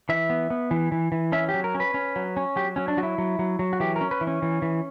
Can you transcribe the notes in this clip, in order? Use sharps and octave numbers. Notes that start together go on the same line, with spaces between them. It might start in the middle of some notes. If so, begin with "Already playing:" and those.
E3 E5
B3
B3
E3
E3
E3
C#4 E5
G4
F#3
A#4
C#4
B4
C#4
F#3
C#4
F#3 G4
F#3 C#4
D4
F#3 F#4
E4
F#3
F#3
F#3
F#4
E3 G4
A#4
C#4
B4
E3
C#4
E3
E3